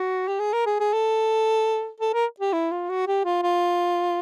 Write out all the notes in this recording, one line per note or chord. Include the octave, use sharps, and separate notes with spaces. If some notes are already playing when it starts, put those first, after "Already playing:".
Already playing: F#4
G4
G#4
A#4
G#4
G#4
A4
A4
A#4
G4
E4
F4
F#4
G4
F4
F4